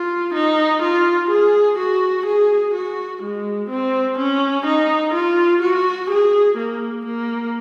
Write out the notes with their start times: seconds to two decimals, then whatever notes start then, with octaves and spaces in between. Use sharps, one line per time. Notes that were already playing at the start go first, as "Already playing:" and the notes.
Already playing: F4
0.34 D#4
0.82 F4
1.30 G#4
1.79 F#4
2.26 G#4
2.74 F#4
3.23 G#3
3.70 C4
4.18 C#4
4.66 D#4
5.14 F4
5.62 F#4
6.10 G#4
6.58 A#3
7.06 A#3